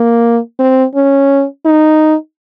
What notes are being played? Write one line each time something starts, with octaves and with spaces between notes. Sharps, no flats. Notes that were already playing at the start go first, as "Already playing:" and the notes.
Already playing: A#3
C4
C#4
D#4